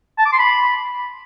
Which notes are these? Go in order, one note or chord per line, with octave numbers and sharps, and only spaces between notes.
A5
D6
C6
B5